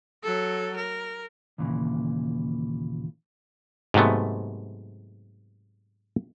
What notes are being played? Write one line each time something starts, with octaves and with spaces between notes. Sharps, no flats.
F#3 A4
A#4
D#2 A#2 C#3 E3
G#2 C3 F#3 A3 B3